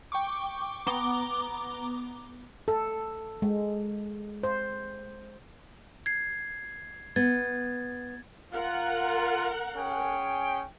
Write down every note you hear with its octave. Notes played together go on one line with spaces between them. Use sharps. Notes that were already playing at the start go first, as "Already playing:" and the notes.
G5 C#6 D6
B3 A#5 D6 G7
A4
G#3
C5
G#6 C7
B3 G#6 A6
F4 A#4 F#5
C#4 G#4 G5